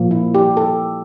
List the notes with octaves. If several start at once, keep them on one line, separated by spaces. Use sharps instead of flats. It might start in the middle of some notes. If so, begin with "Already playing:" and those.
Already playing: A#2 F3 A#3
E4
G4
A4